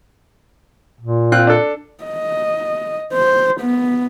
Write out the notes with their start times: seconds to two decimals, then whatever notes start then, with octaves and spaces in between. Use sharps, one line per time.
1.01 A#2
1.32 C4 F4 F#6
1.47 D4 A4
2.04 D#5
3.13 C5
3.61 B3